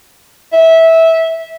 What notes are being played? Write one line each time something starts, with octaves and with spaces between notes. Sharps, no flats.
E5